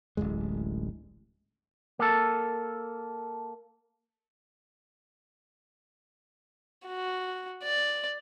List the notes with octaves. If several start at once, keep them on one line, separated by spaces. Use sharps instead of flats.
D1 A1 A2 G#3
A#3 A4
F#4
D5